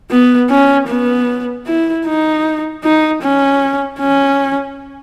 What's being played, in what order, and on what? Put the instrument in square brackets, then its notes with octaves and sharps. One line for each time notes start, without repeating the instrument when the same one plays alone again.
[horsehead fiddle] B3
C#4
B3
E4
D#4
D#4
C#4
C#4